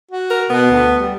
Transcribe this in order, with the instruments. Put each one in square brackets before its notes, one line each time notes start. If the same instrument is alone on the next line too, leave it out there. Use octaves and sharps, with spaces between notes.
[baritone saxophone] F#4
[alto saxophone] A#4
[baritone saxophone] B2 [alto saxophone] B3
[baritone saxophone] D2
G3